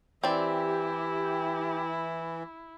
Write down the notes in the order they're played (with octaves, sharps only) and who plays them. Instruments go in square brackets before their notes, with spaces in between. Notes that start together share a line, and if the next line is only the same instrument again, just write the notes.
[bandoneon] E3 [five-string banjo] C4 D5 [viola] E4 [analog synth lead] G4